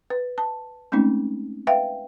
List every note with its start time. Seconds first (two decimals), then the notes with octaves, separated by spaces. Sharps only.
0.10 B4
0.38 A5
0.92 G#3 A3 C4 C#4 D#4
1.67 B4 E5 F5 G5